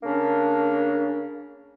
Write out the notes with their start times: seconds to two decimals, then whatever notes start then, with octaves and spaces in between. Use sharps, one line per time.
0.03 C#3 A#3 C#4 D4